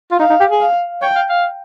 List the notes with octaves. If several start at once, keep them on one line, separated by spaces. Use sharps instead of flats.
F4
D#4 F5
D#4
G4
G#4
F5
C#5 G5
F5
F5